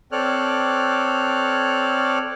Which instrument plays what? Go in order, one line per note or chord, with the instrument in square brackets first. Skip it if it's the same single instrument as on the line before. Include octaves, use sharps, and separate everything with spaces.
[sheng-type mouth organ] C4 A4 C#5 D5 F6 F#6